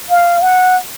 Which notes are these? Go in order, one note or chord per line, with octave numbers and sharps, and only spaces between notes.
F5
F#5